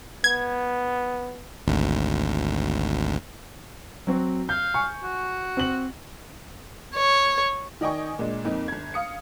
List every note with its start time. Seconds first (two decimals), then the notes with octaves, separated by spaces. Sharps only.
0.24 B3 G#6
1.67 G#1 D2
4.07 F#3 C4 F#4
4.49 F5 G6
4.74 G#5 C#6
5.03 F#4
5.57 C4 F#7
6.96 C#5
7.81 D#3 D5 D#5 G5 G#5 C#6
8.19 A#2 G#3 D4
8.45 F2 A#3 C4 D#4
8.68 G1 G#6
8.94 F5 D#6 C#7